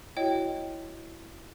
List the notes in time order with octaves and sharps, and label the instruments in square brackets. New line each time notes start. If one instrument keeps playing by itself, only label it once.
[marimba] E4 F#4 [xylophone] C#5 D#5 G5